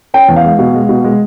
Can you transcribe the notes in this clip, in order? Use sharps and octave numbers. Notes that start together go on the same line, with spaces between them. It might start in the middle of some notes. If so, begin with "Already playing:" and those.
C#4 G5
E2
F5
G#3
B2
G#3
B2
G#3